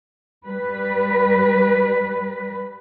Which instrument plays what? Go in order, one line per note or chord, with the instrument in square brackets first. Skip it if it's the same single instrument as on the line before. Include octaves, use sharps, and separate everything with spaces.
[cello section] G3 B4